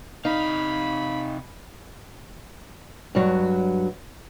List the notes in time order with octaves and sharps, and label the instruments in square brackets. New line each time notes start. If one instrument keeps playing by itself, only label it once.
[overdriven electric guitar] C3 F5 [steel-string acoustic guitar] D#4 [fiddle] B5
[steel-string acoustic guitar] G2 F#3